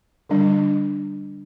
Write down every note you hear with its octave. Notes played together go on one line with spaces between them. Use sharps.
D3 G3 D4